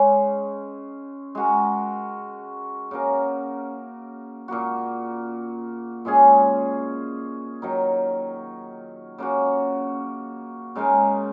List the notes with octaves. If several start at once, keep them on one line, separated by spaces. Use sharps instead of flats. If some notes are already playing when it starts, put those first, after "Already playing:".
Already playing: C#3 G#3 C#4
G#3 F#4 A#4
C#3 A#3 F#4 A#4
A#2 A#3 F#4
A#2 G#3 C#4 G#4
D#3 F#3 D#4 A#4
C#3 A#3 F#4
C#3 G#3 D#4 A#4